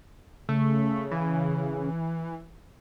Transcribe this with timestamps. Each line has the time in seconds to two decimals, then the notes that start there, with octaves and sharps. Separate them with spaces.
0.49 C#3 A3
1.11 E3